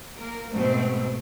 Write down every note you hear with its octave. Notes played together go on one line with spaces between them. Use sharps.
A#3 A#4
G#2 B2 A3 C4